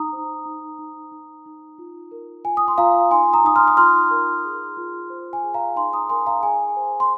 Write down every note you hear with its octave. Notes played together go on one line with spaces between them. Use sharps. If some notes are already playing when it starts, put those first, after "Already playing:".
Already playing: D#4 A#5 D#6
C5
D#4
D#4
D#4
D#4
F4
A#4
F4 G#5
D#6
C6
F4 F5 A#5
D#4 G#5 C6
A#5 D#6
D#4 D#6
C6 F6
D#6
F4 C6 F6
A#4
G#4
F4
C5
G#5
G#4
F5 A#5
D#4 G#5 C6
A#5 D#6
A#4 G#5 C6
F5 A#5
G#4 G#5
C5
C6